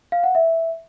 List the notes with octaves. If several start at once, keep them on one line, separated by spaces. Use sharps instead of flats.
F5
F#5
E5